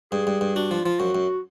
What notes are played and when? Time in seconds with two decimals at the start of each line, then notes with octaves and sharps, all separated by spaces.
0.12 G2 G#4
0.27 G2
0.41 G2
0.56 D4 F#4
0.71 F3 F4
0.85 F3 F4
1.00 F#2 F#4
1.15 F#2